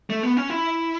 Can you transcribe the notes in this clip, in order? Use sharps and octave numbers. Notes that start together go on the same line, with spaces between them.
A3
B3
C#4
E4